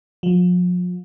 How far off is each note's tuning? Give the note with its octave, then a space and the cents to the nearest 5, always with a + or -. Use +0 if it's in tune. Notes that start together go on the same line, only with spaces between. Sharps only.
F3 +40